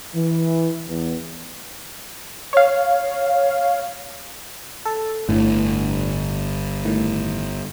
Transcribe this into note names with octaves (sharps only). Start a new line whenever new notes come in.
E3
E2
C#5 F5
A4
G1 A2 D3
A2 D#3